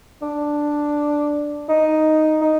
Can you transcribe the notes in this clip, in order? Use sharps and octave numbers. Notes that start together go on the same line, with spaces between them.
D4
D#4
D#4